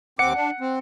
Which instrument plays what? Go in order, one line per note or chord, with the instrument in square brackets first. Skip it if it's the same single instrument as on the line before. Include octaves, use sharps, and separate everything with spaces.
[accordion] D#2 C4 D6 [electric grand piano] F#5 C#7
[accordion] D4
C4